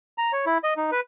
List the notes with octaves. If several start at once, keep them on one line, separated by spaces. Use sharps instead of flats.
A#5
C#5
E4
D#5
D#4
B4